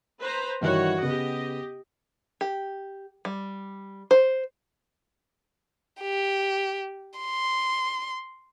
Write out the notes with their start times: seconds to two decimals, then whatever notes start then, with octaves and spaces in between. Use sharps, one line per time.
0.22 B4 C5 A#5
0.61 G2 D#3 E3 F#4 C#5 F#5
1.02 C#3 B3 G4 D#5
2.41 G4
3.25 G3
4.11 C5
6.02 G4
7.19 C6